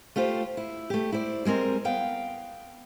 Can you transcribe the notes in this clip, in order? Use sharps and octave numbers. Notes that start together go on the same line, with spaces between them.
A3 F4 G4 C5
E4
A3 G4
E4 C5 D5
G3 G#3 C4 A#4 D#5
B3 F5 G5